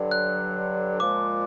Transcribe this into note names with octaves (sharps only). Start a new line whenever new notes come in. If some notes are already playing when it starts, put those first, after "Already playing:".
Already playing: G2 D3 F#3
F#6
A#2 F3 G#3 D6